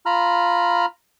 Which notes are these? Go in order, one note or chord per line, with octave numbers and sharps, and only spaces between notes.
F4 A#5 B5 F6